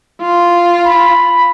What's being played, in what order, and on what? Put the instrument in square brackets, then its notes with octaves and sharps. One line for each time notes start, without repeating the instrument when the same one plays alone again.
[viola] F4
[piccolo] B5